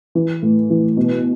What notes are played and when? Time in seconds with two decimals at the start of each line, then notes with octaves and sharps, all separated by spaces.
0.15 E3
0.42 A2
0.70 E3
0.97 B2